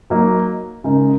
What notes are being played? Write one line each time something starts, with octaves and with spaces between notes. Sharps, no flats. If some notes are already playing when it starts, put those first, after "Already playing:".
F#3 A#3 D#4
C#3 G#3 D#4 A#4